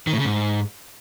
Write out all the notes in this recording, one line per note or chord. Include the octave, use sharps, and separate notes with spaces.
D#3
A2
C#3
G#2